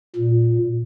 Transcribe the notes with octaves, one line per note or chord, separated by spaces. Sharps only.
A#2